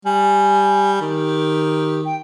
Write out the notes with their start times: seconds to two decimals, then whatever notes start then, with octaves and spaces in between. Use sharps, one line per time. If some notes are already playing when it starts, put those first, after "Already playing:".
0.05 G3 G#5
1.01 D#3 G4
2.05 G5